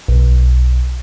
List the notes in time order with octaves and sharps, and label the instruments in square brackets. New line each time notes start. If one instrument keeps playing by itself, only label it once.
[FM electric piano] B1